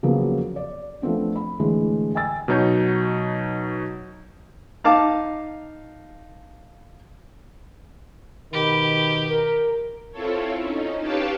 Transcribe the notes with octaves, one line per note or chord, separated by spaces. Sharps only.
C#3 F3 F#3 A#3 B3
D5
F3 A3 B3 C4 D4
B5
A2 D3 E3 G#3
G5 G#5 E6 A6
B2 F#3 D#4 C#5 G6
D#4 F5 A5 D6
B2 D#3 G4 B5
A#4
C4 E4 F4 A4 C#5
C#4 D#4
G4 B4 C#5 F5 G5 A5